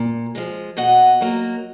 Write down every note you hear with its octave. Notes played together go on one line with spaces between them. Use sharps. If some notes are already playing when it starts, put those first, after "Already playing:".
Already playing: A#2
F3 G#3
B2 D#5 F#5
F#3 A#3